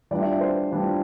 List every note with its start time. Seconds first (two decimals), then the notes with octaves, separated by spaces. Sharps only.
0.11 E3 G3 D4 F4 D5
0.21 E5
0.31 D5
0.41 C5
0.71 E3 G3 D4 F4